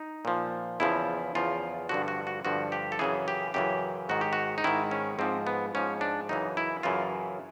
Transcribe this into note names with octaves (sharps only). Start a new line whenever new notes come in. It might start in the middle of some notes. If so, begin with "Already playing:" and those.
Already playing: D#4
A#2 F3
E2 C#3 F3 E4
E2 C#3 F3 F4
G2 D3 F3 F#4
F#4
F#4
G2 D3 F3 F#4
G4
A4
F#2 C#3 E3 G#4
G4
F#2 C#3 E3 G4
G#2 D#3 F#4
G4
F#4
D#4
G#2 D#3 E4
C#4
G#2 F3 C4
B3
G#2 F3 C#4
D4
F#2 C#3 E3 D#4
E4
F#2 C#3 E3 F4